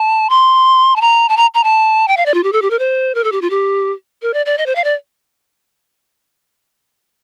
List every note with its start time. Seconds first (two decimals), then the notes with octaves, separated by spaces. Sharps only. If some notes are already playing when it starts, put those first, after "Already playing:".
Already playing: A5
0.30 C6
0.96 A5
1.01 A#5
1.29 A5
1.37 A#5
1.54 A#5
1.64 A5
2.08 G5
2.17 F5
2.26 D5
2.34 F4
2.44 G4
2.53 A4
2.62 G4
2.70 A#4
2.79 C5
3.15 A#4
3.24 A4
3.32 G4
3.42 F4
3.50 G4
4.22 A#4
4.34 D5
4.46 D5
4.58 D#5
4.66 C5
4.75 F5
4.84 D5